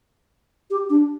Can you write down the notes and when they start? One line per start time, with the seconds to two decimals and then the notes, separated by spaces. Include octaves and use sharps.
0.71 G4
0.90 D4